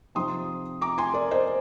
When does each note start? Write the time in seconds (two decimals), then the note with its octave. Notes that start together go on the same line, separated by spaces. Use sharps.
0.15 C3 F3 C4 D#4 C6 D#6
0.81 A#5 D6
0.98 G#5 C6
1.14 A#4 D5
1.31 C5 D#5